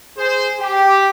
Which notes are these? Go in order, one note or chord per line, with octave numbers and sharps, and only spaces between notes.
G#4 C5
G4